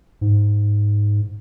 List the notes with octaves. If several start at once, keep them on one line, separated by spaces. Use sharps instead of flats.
G#2